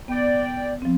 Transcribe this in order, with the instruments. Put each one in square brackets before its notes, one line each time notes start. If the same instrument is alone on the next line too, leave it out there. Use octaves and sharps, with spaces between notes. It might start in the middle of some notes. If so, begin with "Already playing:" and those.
[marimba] B3 [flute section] D5 G5
[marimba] F3 C4